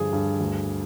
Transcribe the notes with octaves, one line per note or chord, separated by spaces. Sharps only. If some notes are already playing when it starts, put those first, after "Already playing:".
Already playing: G2 D3 F3 G#4
G2
D2